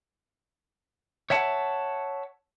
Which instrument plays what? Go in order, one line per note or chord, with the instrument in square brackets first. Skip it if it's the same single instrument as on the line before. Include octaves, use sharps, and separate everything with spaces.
[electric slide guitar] C#5 E5 F#5 A5